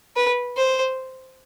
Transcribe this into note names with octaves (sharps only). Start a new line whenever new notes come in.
B4
C5